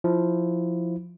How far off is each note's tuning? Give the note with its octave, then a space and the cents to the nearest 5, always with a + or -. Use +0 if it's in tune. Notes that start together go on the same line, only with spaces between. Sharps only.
F3 +0 E4 -5